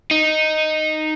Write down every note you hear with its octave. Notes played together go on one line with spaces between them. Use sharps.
D#4